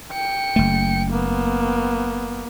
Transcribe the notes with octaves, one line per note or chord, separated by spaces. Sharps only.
G5 C#7
F#1 A3
A#3 B3